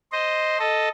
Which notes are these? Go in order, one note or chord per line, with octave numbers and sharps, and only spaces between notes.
C5 D#5
A4 D#5